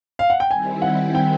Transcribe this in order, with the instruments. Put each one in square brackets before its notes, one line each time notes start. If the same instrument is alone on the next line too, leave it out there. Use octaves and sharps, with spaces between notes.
[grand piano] F5
F#5
G5
[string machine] D#3 G3 C4 E4 [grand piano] G#5
[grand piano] F#5
G5